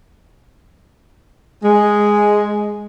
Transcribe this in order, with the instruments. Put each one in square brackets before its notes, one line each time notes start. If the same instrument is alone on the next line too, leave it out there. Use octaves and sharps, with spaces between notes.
[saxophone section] G#3